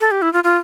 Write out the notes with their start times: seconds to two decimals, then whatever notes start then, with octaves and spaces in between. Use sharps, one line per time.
0.01 A4
0.11 G4
0.22 E4
0.33 F4
0.44 F4